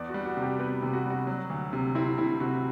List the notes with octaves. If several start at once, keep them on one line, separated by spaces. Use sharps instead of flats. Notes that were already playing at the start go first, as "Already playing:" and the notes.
Already playing: E2 D5
F#4
G3
F#4
C3
G4
B3 B4
C3
F#4
G3
F#4
F#3
D2
C3
C4 E4
C3 E4
C3 F#4